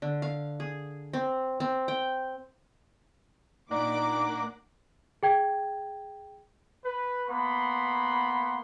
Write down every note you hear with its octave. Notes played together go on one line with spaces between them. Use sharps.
D3
F5
G#4
C4
C4
G5
A#2 A#3 D4 D#4 D5 F#5 D6
G#4 G5 G#6
B4
A#3 B3 F#5 B5 C6